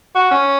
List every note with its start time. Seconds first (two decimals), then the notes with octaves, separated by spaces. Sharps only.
0.15 F#4
0.31 C#4